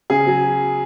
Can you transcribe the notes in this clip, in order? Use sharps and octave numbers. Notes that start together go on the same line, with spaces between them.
C#3 G#4
F#3